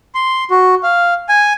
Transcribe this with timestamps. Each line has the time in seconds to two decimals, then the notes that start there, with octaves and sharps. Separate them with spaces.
0.15 C6
0.50 F#4
0.83 F5
1.29 G#5